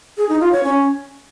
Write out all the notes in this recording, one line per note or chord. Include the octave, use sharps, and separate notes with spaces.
G#4
D#4
F4
C#5
C#4